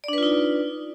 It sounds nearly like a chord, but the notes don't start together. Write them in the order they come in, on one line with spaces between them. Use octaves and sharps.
D5 D4 B4 F4 D#4